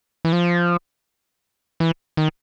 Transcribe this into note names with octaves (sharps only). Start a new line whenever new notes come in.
E3
F3
E3
D#3